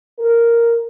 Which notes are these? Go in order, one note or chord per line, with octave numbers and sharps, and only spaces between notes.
A#4